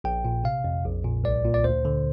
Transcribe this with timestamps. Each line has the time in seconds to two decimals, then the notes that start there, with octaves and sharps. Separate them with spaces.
0.04 A#1 G5
0.25 A#2
0.44 C3 F5
0.64 F2
0.85 A#1
1.04 A#2
1.24 C2 D5
1.44 A#2
1.54 D5
1.64 D2 C5
1.85 D3